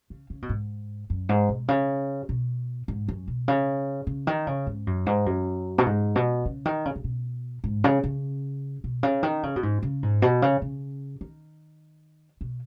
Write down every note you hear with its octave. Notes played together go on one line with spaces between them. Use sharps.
C#3
C#3
B2
G#2
F#2
G#2
B2
C#3
B2
G#2
F#2
B2
C#3
C#3
D#3
C#3
G#2
F#2
G#2
F#2
B2
G#2
B2
C#3
D#3
C#3
C#3
B2
G#2
C#3
C#3
B2
C#3
D#3
C#3
B2
G#2
C#3
G#2
B2
C#3
C#3
D#3
B2